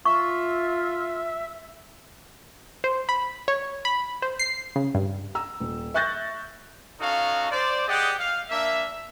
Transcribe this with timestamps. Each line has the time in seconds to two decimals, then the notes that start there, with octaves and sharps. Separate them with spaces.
0.05 F4 E5 C#6
2.84 C5
3.09 B5
3.48 C#5
3.85 B5
4.22 C5
4.39 C7
4.76 C#3
4.95 G2
5.35 A#5 E6
5.60 D#1
5.94 E5 C#6 F#6 G6 A6 A#6
7.00 C#4 D#4 F#4 A4 F5
7.51 C5 D5
7.87 G4 G#4 D5 D#5 F#5
8.18 F5
8.49 A#3 D4 E5